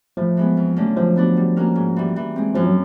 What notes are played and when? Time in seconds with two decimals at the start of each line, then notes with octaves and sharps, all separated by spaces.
0.17 A2 F3
0.37 E3 G#3 B3
0.57 F2
0.76 D3 F#3 A3 C#4
0.97 F3 F#3
1.16 B3 D4 F#4
1.37 G3
1.56 A#3 C#4 F#4 A#4
1.76 G#2
1.96 E3 G3
2.16 E3
2.36 G#3 C4
2.55 F#2 F3
2.65 F#3